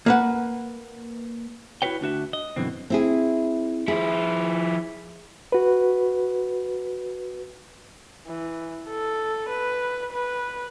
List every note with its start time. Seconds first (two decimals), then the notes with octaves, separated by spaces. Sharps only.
0.06 A#3 B4 F#5
1.82 E4 F#4 A#4 B4 C#5 G5
2.01 D2 D4 F#4 E5
2.33 D#5
2.56 F#2 B2 D3 E3 C4
2.90 C4 E4 G#4
3.88 F3 E4 G#4
5.52 F#4 B4
8.27 E3
8.89 A4
9.50 B4
10.13 B4